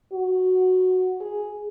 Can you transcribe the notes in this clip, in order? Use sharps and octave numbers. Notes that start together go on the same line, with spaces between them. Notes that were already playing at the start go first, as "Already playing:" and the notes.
F#4
G#4